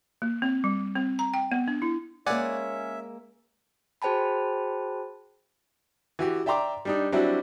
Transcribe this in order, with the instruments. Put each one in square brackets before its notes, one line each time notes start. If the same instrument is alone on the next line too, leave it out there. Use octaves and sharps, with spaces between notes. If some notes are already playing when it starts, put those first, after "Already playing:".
[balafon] A#3
C4
G3
C4
A#5
G5
B3
D4
E4
[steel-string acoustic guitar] G#3 A#3 [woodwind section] C#4 C#5 [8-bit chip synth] D5 F#5 G#5 [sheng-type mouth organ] E5
[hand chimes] F#4 G#4 C5 G5 A5 B5
[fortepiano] E3 F#4 G4
D5 E5 G5 A#5 C6 D6
G3 D4 D#4
F#3 G3 C4 D4 E4 F#4